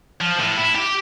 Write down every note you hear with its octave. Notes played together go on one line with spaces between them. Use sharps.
F3
A2
E4
G4